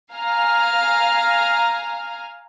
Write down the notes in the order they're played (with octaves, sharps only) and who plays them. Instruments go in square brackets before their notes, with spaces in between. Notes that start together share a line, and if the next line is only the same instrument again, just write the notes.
[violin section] F5 G#5 A#5 F6